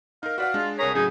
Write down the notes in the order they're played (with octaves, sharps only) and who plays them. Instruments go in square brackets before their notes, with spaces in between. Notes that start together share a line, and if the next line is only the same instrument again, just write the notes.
[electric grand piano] D#4 A#4 [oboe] F5
[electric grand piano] F#4 D5 F#5 [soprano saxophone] B4 [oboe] F5
[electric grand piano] G#3 D4 [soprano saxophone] F4
[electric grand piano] C2 A#4 B6 [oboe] G#4 [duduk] C#5 [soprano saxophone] A#5
[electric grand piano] A2 C#3 F#3 [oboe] D#4 [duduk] G#4 [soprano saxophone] G#5